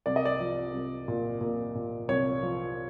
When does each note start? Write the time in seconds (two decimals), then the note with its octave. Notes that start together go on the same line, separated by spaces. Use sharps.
0.06 C2 D5
0.16 D#5
0.25 D5
0.40 F3
0.73 C2
1.08 A#2
1.41 A#2
1.75 A#2
2.08 C2 C#5
2.43 F3